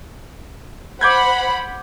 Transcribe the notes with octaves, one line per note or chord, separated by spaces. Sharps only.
C5 F#5 B5 D6 G6 G#6